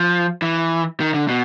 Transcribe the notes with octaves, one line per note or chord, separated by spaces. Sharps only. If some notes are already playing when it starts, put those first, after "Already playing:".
Already playing: F3
E3
D#3
D3
B2